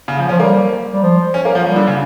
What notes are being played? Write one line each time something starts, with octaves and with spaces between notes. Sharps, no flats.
C#3
F3
C#4
F3
G3 A#3
G3
F3
C#4
A#3
F3
F3 G3
D3
C#3